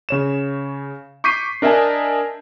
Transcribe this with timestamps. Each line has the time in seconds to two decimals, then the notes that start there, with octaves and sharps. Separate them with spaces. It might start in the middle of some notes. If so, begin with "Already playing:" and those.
0.09 C#3 C#5 E7
1.24 C#6 D6 G6 B6 C7 D#7
1.62 D4 A#4 D#5 E5 G#5 A5